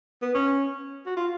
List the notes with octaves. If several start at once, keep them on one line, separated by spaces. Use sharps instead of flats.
B3
C#4
F#4
F4